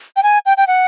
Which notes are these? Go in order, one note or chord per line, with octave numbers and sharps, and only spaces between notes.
G5
G#5
G5
G5
F#5